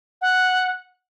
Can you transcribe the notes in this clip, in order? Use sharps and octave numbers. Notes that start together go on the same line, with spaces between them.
F#5